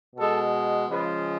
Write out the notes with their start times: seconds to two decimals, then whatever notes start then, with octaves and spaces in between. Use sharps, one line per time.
0.16 B2 G#3 A4
0.89 C#3 F3 G#3 B4